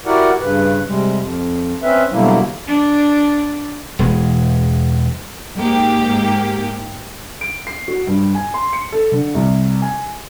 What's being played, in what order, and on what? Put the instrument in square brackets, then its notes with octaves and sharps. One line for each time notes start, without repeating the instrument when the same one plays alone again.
[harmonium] E4 F#4 G4 A#4 D5 F#5
G2 C#3 B4
C3 G3 G#3
F2
C4 C#4 B4 E5
B2 D3 F#3 G3 A#3 E4
[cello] D4
[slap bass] E1 G#3
[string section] G#2 A#3 G4
[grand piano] D7
C7
F#4
G2
G#5
C6
C#7
A4
D3
C2
G#5